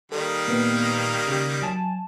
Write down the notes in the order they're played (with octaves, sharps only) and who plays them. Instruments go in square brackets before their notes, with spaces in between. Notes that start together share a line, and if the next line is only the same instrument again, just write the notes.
[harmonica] D#3 G3 A#3 [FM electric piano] A4
[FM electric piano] A#2 B3
C#3 G4
F#3 G#5 A5